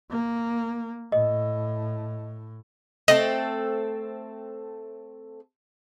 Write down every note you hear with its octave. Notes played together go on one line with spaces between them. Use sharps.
A#3
A2 D#5
A3 C4 A4 D#5